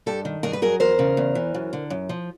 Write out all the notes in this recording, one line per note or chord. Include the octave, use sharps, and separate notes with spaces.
G2 G4 A4
D#3
G2 G#4 A#4
B4
F#3 G#4 A#4
E2 A#4 C5
C#3
E2
E3
F#2
D3
F#2
F3